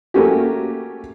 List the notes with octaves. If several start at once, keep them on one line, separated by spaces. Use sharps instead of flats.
A3 A#3 C#4 F#4 G4